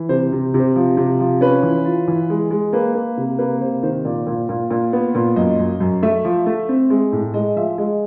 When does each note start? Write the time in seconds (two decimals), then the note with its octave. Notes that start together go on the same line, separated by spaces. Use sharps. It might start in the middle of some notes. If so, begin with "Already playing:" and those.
Already playing: E3
0.09 C3 C5
0.32 C3
0.54 C3
0.59 C5
0.76 F3
0.97 C3
1.20 F3
1.41 C#4 B4
1.63 E3
1.85 F4
2.08 E3
2.30 G#3
2.51 G#3
2.73 A#3 B4
2.95 A#3
3.17 C3
3.39 A#3 B4
3.60 C3 C5
3.83 D#3 C5
4.04 A#2 D5
4.27 A#2
4.49 A#2
4.71 A#2
4.93 B3
5.15 A#2
5.36 F#2 D#5
5.59 F#2
5.80 F#2
6.03 A3 E5
6.25 F3
6.46 A3
6.69 C4
6.90 G#3
7.12 A2
7.34 G#3 D#5
7.56 F3 E5
7.78 G#3 D#5